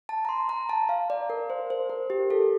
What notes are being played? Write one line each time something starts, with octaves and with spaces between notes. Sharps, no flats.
A5
A#5
C6
A#5
A5
F5
D5
A#4
C5
C5
A#4
G4
A4